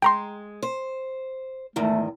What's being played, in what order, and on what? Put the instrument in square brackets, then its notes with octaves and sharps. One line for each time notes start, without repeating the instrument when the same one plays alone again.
[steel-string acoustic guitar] G#3 [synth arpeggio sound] G5 A#5 C6
[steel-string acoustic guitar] C5
[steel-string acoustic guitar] E2 G#2 D#3 [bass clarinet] A3